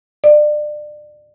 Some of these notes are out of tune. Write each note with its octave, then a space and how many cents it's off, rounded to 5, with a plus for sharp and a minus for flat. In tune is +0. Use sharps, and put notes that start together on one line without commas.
D5 +30